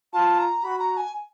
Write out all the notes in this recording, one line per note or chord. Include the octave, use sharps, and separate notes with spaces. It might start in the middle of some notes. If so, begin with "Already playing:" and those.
F4 A5
A#5
F#4 B5
A#5
G#5